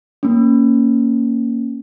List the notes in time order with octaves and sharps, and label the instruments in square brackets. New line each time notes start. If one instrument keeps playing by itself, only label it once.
[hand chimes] A#3 C#4